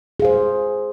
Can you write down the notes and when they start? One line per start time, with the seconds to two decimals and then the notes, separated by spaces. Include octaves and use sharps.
0.20 G#4
0.22 F5
0.25 C5